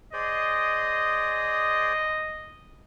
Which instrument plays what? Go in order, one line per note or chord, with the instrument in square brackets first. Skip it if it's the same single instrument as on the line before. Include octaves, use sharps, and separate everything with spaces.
[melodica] G#4 C5 D5 [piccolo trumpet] D#5